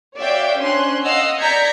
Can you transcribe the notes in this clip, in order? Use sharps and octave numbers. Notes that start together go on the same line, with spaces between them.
F#4 C#5 D5 E5 F5 G5
C#4 D4 C5 C6 F#6
D#5 F5 F#5 E6 C7
D5 A#5 G6 G#6 B6 C#7